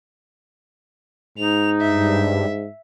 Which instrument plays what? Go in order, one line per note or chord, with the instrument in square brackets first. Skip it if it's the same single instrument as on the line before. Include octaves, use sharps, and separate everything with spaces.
[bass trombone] G#2 [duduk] D#4 [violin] F7
[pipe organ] G2 [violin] E5